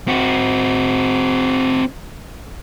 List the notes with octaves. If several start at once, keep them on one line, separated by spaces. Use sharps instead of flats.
C4 F#4